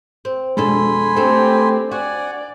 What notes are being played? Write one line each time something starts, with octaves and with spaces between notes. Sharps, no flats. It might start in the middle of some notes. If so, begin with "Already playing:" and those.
C4
F2 B2 G#3 D4 A4 G#5 B5 C6
A3 C4 D4 G4 A4
C4 F#4 D5 F#5 G#5